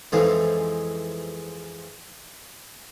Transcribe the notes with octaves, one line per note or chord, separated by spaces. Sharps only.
F2 G#2 E3 F3 G#3